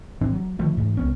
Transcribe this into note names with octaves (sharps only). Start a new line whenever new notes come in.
A2 E3 C4 D4
F#3
D3 D#3 F3 A3
G#2 E3 A3
C2 B3 C#4